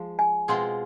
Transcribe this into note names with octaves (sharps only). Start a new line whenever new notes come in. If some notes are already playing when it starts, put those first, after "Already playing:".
Already playing: F3 G#3
G#5
B2 G#3 C4 F4 G#4